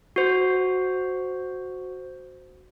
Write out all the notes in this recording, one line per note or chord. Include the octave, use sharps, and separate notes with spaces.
F#4 C5